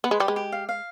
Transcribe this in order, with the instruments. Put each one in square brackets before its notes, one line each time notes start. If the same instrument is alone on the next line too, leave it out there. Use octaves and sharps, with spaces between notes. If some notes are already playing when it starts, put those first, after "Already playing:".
[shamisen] B3 [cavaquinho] B4
[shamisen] G#3
[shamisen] G3 [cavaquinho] G4
[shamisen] G#3
[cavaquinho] G4
F5
F5